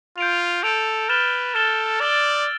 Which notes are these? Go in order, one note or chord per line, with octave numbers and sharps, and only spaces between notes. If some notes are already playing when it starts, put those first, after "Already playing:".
F4 G6 D7 F7
A4 G6 D7 F7
B4 F6 A6 E7 G7
A4 F6 A6 E7 G7
D5 E6 A6 D7 G7